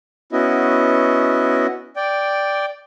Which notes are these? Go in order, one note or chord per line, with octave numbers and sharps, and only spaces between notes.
B3 C#4 E4 F#4 D#5
D5 G5